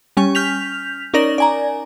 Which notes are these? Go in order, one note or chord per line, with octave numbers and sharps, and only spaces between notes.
G3 C#4 G#5 C#6
F6 G6 B6 F7
C#4 D#4 A#4 D5 A#6 F#7
D5 G#5 A#5